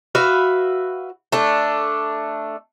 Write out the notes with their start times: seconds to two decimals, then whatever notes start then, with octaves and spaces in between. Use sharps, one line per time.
0.15 F#4 B4 E5 F5
1.32 A3 D4 A4